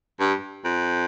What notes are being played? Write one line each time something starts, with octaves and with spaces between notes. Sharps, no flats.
G2
F2